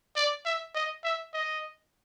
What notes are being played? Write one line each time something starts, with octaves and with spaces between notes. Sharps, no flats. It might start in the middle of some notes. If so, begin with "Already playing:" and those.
D5
E5
D#5
E5
D#5